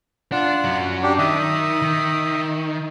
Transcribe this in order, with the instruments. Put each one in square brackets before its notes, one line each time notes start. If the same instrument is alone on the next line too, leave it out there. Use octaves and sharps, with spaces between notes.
[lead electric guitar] D4 [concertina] F4 F#5
[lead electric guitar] F#2 F#3
[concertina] D4 G4
[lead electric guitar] D#3 [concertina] E5 D#6
[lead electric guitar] D#3